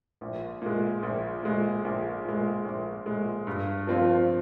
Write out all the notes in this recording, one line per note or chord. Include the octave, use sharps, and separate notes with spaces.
A#1
A#2 G#3
A#1
A#2 G#3
A#1
A#2 G#3
A#1
A#2 G#3
G2
F3 C4 F4